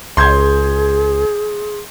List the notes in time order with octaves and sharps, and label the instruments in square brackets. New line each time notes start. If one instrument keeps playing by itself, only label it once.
[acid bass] C#2 [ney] G#4 [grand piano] C6 G6 G#6